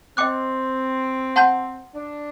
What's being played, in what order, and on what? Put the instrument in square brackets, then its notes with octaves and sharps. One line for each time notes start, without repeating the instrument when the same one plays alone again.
[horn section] C4 [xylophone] D#5 G5 D6 F#6
[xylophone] F#5 A5 C6 G6
[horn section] D4